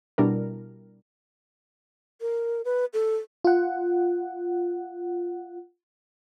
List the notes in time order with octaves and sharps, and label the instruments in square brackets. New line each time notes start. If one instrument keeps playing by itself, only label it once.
[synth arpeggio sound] B2 G3 D4 E4 A#4
[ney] A#4
B4
A4
[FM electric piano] F4 F#5